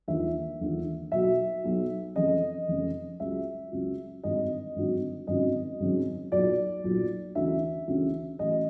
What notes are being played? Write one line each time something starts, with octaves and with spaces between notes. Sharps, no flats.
E1 D#2 D3 F3 E5
E1 D#2 D3 F3
B1 B2 F#3 E5
B1 B2 F#3
F1 F2 C#3 D#5
F1 F2 C#3
C#2 C#3 F#3 E5
C#2 C#3 F#3
G#1 G2 D3 F#3 D#5
G#1 G2 D3 F#3
G#1 F#2 C#3 F#3 D#5
G#1 F#2 C#3 F#3
B1 A#2 F#3 D5
B1 A#2 F#3
D2 C#3 E3 E5
D2 C#3 E3
A1 A2 F#3 D#5